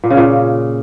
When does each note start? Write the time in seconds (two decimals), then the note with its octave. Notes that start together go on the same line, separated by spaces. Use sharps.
0.04 A#2
0.10 C#3
0.17 A#2